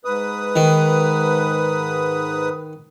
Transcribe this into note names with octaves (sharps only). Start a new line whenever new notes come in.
G#2 B4 D#6
D#3